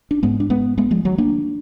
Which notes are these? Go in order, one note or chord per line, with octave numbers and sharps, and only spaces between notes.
D4
G#2 G#3 B3
D4
G#3 B3
G#3 B3
F3 G#3
D#3 F#3
A#3 D4